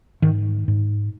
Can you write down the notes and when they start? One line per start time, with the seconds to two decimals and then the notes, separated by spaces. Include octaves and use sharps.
0.22 G#2 D#3
0.68 G#2